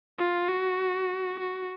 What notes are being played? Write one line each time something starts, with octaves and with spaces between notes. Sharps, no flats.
F4
F#4
F#4